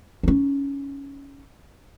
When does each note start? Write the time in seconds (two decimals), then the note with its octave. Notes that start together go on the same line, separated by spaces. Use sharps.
0.23 C#4 D#4